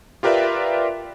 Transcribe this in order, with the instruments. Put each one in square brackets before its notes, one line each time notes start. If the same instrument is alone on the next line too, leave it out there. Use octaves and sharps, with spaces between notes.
[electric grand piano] F4 G4 A#4 B4 D5 E5